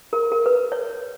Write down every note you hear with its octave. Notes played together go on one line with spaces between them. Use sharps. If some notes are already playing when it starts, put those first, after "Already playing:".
A#4
A#4
B4
C#5